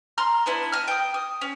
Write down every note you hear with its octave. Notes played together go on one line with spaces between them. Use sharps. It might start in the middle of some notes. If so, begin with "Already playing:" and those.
A#5 C6 F6
B3 D4 E4
D#5 F6
G5 D#6
D#6
C#4